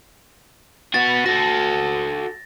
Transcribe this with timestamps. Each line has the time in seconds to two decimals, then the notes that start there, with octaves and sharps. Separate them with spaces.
0.94 B3 F#4 A6
1.26 F#4 A4 A#6